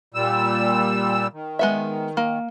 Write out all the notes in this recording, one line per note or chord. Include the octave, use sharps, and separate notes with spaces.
A#2 G3 E6
D#3
G#3 B3 E5
A#3